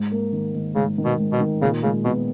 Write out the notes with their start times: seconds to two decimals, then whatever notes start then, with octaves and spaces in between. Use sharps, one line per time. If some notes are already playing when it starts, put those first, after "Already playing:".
Already playing: G#2
0.11 A#3
0.33 D#3
0.55 D#3
0.75 G#2 C#3
0.98 D#3
1.05 B2
1.18 G#2
1.33 B2
1.40 D#3
1.62 A#2 C#3
1.83 C#3 G#3
2.05 B2 B3